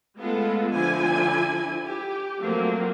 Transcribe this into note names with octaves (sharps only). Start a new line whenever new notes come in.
G#3 A3 B3 F4 A4
D3 F3 E4 G#5
G4
F3 F#3 A3 A#3 C4